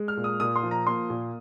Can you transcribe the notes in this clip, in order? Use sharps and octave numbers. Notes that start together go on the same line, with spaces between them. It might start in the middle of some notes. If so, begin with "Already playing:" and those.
Already playing: G#3
F6
A#2
D#6
A#2 D#6
C6
F3
A#5
A#3 C6
A#2